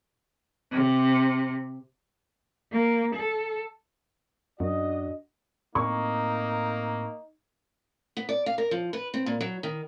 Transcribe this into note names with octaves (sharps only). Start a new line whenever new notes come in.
C3
A#3
A4
F#2 D4 F#4 D#5
A2 A#3 C4 D#4 C#6
B3
D5
F5
A#4
F3
B4
C4
A#2
F#3
D#3